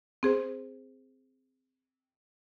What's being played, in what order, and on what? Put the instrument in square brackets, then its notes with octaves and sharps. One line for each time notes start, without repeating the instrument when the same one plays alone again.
[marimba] C4 G#4 C5